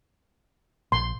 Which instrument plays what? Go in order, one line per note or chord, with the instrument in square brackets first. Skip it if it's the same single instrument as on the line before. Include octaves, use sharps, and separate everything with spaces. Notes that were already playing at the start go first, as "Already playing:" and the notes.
[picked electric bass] A#1 [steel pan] C6